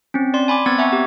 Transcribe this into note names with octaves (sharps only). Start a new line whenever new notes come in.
C4 C#4
D5 C6
G#5 B5 C6 D6
B3 C4 E6 G#6 A6
E5 F#5 G#5 A#5 C#6
G4